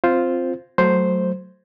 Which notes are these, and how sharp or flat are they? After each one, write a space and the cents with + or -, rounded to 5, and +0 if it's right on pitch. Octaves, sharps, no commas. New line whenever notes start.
C4 +0 F4 +0 C5 +0
F#3 +10 A3 +0 C5 +0